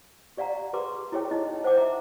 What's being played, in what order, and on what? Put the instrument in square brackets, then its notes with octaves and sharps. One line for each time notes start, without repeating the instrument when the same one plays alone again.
[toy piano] G4 D5 F5 F#5 A#5
G4 G#4 B4 A#5 C6 D6
E4 G4 G#4 C#5 G5 D6
D#4 E4 D#5
C5 F#5 G5 D6
E5 A#5 D6